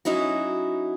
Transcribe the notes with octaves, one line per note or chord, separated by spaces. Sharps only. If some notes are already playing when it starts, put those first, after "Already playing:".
F#3 C#4 D#4 E4 F#4